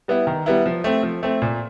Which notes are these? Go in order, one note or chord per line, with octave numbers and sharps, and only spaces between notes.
G3 B3 E4
D#3
G3 B3 E4
F3
A3 C4
F3
A3 C4
A#2